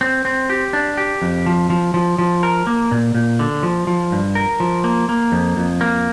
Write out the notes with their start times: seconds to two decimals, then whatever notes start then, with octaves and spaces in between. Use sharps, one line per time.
0.01 C4
0.25 C4
0.50 G4
0.73 D4
0.97 G4
1.22 F2
1.46 F3
1.70 F3
1.94 F3
2.18 F3
2.43 A#4
2.67 A#3
2.91 A#2
3.15 A#2
3.39 D3
3.63 F3
3.87 F3
4.12 G2
4.35 A#4
4.60 F3
4.84 A#3
5.09 A#3
5.32 F2
5.57 F2
5.81 A#3